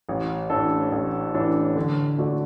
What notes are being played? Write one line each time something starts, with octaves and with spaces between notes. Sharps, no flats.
A1
A2 E3 D4 A4
A1
A2 E3 D4 A4
D3
A3 F#4 D5